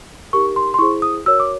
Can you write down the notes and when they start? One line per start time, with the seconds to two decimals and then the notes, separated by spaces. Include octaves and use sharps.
0.33 D#4 G4 A#4 C#6
0.56 C6
0.74 C6
0.79 E4 G#4 C5 C#6
1.02 D#6
1.25 F#4 A#4 C#5 E6
1.40 D6